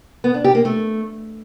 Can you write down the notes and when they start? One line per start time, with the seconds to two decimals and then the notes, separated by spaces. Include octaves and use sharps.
0.24 B3
0.34 D4
0.44 G4
0.55 A#3
0.65 A3